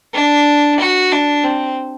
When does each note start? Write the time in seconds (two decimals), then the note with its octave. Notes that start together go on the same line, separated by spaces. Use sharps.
0.14 D4
0.79 F#4
1.12 D4
1.44 C4